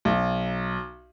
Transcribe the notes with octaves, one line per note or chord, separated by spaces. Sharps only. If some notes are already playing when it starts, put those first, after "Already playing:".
B1